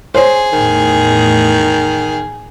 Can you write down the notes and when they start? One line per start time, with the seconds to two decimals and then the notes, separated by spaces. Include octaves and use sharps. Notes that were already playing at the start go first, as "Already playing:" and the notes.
0.15 G#4 C5 C#5
0.53 E2 A2 D#3